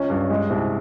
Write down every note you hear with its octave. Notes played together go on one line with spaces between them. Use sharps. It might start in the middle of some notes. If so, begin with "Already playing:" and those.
Already playing: C#2 C#4
G2
G#3
C2